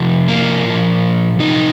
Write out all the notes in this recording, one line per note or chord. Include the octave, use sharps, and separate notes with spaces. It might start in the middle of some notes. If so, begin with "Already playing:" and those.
Already playing: C3 F3
A#3
A#2 F3
C3 F3 D#4